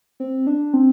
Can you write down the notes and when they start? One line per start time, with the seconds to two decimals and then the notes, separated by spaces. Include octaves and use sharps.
0.20 C4
0.47 D4
0.74 C4